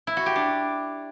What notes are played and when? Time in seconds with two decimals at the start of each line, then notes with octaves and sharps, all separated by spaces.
0.07 E4
0.17 F#4
0.26 G4
0.36 D4